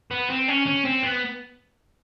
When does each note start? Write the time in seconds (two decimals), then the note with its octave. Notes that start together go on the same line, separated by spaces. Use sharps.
0.11 B3
0.30 C4
0.48 C#4
0.66 C#4
0.85 C4
1.04 B3